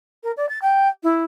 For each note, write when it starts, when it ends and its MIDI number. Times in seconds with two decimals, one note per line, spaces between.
0.23 0.31 70
0.37 0.48 74
0.49 0.59 93
0.61 0.88 79
1.03 1.23 64